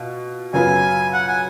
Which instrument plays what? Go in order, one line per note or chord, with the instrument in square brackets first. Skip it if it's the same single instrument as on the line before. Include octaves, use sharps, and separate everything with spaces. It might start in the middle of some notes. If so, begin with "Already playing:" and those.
Already playing: [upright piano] B2 F4
[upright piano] F#2 C#3 F#3 B3 F4 [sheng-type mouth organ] G#5
[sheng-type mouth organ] F#5
G#5